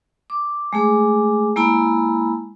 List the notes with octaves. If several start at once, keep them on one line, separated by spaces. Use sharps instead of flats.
D6
G#3 A3 G#4 D6
G#3 A#3 E4 A5 B5